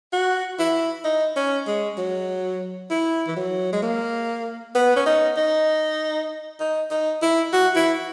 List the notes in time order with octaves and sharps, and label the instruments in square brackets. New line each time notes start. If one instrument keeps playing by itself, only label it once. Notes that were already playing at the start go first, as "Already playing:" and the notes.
[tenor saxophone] F#4
E4
D#4
C#4
G#3
F#3
E4
E3
F#3
G#3
A#3
B3
C#4
D#4
D#4
D#4
D#4
E4
F#4
E4